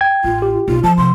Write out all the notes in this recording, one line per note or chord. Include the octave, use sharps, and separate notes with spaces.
G5 G#6
A1 F4
G4
B1 F4
E3 F3 A5
C3 C6